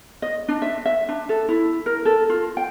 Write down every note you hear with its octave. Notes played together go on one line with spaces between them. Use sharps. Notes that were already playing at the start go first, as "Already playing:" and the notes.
D#5
D4
E5
E5
D4
A4
E4
A#4
A4
F4
G5